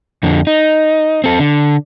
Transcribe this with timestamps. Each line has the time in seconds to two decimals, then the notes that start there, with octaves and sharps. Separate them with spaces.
0.23 F2 D3
0.47 D#4
1.24 C4 A4
1.39 D3